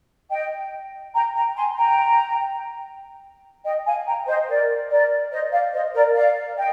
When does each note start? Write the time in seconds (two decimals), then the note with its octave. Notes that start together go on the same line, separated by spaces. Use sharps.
0.30 D#5 G5
1.14 G5 A#5
1.35 G5 A#5
1.56 G#5 C6
1.77 G5 A#5
3.65 D#5 G5
3.86 F5 G#5
4.06 G5 A#5
4.27 C5 D#5
4.48 A#4 D5
4.90 A#4 D5
5.32 C5 D#5
5.52 D5 F5
5.73 C5 D#5
5.94 A#4 D5
6.15 D5 F5
6.56 D#5 G5